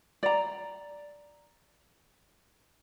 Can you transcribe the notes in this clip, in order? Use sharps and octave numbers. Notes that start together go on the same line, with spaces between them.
D5 A#5